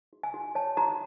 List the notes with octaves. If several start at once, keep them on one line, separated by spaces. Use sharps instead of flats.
F#4
G#5
F#4
C#5 A5
F#4 A#5